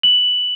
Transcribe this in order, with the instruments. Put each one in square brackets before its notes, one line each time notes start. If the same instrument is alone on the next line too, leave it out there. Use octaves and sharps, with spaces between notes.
[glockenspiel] F#7